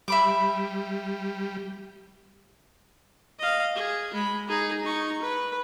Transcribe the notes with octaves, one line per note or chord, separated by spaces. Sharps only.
G3 E5 B5 D6
D#5 F5
G#4
G#3 B5
D#4 G#4
D#4 C#6
B4